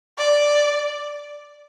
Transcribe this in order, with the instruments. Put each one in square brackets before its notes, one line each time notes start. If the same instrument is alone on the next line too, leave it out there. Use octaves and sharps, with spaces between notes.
[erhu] D5